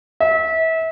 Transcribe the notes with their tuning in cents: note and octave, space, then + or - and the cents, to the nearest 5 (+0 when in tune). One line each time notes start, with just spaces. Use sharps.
E5 -30